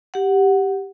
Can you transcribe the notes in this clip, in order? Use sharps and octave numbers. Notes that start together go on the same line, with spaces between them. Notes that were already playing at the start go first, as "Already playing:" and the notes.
G4 F#5